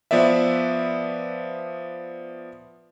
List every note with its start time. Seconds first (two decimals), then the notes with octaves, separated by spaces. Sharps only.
0.11 F3 B3 B4 D5 E5